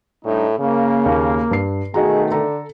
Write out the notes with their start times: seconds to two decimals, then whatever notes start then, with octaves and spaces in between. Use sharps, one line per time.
0.25 A2 G3 D4 D#4
0.59 C#3 A#3
1.06 D#2
1.51 G2 C7
1.94 B2 D#3 A3 D#4 F#4 G#4 A#5
2.31 D3 A4 A#5